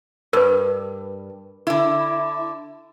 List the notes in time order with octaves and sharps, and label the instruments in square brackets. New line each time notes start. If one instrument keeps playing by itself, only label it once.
[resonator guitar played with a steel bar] G2 [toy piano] A#4 B4
[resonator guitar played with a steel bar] D3 E4